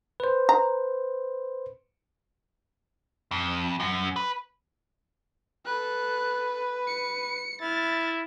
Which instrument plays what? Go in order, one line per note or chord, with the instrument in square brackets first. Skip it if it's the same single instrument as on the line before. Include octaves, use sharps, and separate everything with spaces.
[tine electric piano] B4 C5
[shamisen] A#5
[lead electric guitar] F2
F#2
B4
[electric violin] A4 F#6 [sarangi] B4
[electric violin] C#7
[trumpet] E4 [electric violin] F6 A6